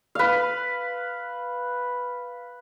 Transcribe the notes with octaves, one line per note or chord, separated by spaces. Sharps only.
B4 F5